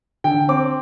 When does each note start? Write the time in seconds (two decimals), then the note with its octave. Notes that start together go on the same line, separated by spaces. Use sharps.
0.24 D3 G5
0.49 C4 D6